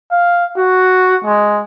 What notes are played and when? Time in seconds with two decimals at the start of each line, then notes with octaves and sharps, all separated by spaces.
0.12 F5
0.57 F#4
1.25 G#3